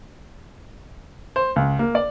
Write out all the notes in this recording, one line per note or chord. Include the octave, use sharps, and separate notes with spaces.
C5
C#2
A#3
D5